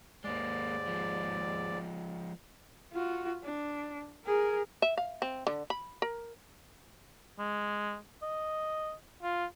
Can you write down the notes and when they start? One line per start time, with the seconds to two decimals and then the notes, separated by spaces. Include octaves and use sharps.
0.24 D#2 G#2 G#3 A#3 D5
0.87 F3 G#3
2.93 F4 F#4
3.43 D4
4.26 G#4 A#4
4.82 E5
4.98 F5
5.22 C4
5.47 D3
5.70 B5
6.02 A#4
7.38 G#3
8.22 D#5
9.23 F4